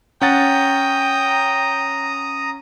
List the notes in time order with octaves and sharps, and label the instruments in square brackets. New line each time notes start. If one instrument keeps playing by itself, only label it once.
[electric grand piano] C#4 F#5 A6 [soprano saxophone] G5 [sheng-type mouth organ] A#5 D#6